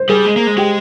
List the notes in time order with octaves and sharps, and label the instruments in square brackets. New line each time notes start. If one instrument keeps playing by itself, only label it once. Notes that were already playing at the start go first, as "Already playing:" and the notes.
Already playing: [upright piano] C5
[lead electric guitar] G3 [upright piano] G#4
[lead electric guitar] G#3
A#3
G#3
[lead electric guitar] G#3 [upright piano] G4